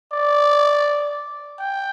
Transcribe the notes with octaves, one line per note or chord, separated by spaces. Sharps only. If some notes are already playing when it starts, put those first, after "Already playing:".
D5
G5